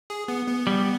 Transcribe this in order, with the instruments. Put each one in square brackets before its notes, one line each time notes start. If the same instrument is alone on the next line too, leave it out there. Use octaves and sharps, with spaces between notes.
[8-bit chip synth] G#4
B3
B3
[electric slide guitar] G3